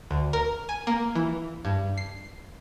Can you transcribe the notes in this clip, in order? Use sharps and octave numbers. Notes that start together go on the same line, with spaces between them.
D2
A#4
G#5
A#3
E3
G2
C7